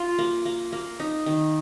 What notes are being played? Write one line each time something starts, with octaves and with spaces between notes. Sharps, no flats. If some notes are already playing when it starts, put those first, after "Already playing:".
Already playing: F4
A#3
A#3
A#3
D#4
D#3